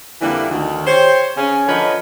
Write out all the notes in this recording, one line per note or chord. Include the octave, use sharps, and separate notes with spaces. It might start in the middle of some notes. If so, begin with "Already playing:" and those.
F2 D3 E3 G3 A#3 E4
D2 D#3
G4 C5 C#5
C#3 C#4
D3 F3 A#4 B4 C#5 D#5